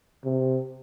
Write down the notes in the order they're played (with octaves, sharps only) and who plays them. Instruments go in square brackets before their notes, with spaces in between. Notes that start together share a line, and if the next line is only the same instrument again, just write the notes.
[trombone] C3